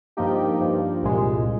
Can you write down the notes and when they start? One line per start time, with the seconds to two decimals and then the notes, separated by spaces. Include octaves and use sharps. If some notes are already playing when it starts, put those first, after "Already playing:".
0.17 G2 F3 A#3 D#4 G4
0.60 G2 F3 A#3
1.03 C2 A#2 G#3